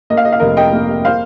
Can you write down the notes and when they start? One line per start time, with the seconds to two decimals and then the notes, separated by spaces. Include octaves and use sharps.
0.10 A#3 D#5
0.17 F5
0.25 D#5
0.32 F5
0.40 F1 A#4 D#5
0.57 D#5 G5
0.73 A#3
1.05 A#3 C5 F5